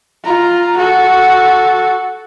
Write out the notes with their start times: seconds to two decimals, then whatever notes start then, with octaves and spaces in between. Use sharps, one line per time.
0.24 F4 A#5
0.77 F#4 A4